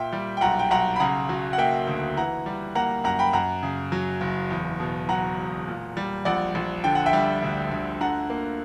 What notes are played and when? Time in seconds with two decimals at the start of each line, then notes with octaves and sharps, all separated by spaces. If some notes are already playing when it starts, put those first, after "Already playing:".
Already playing: A#2 E5 G5
0.13 G3
0.37 G5
0.41 B1 F#5 A#5
0.59 G5
0.71 B1 F#5 A#5
0.96 B5
1.00 C#3 F#5 A#5
1.29 F#3
1.53 F#5
1.58 A#3 E5 G5
1.87 D2
2.17 E3 F#5 A#5
2.46 G3
2.75 A#3 F#5 A#5
3.04 F#2 F#5 A#5
3.19 G5 B5
3.33 F#2 F#5 A#5
3.63 C#3
3.92 F#3
4.21 F#1
4.50 E2
4.80 B2
5.09 F#3 F#5 A#5
5.38 E1
5.68 A#2
5.97 G3
6.25 A#1 D5 F#5
6.55 A#1
6.84 D3 G5
6.95 F#5
7.06 E5 G5
7.13 G3
7.42 D2
7.71 D2
8.00 D3 F#5 A#5
8.30 A#3